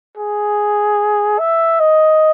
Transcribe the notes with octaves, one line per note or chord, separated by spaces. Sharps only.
G#4
E5
D#5